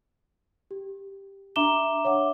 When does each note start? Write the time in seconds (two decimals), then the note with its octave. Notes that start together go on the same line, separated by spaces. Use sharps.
0.71 G4
1.56 D4 E5 A#5 D6 E7 G7
2.05 C#5 E5 F#5 D6